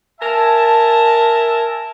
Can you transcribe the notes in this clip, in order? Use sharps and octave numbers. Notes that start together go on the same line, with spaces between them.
A#4 E5 G#5 A5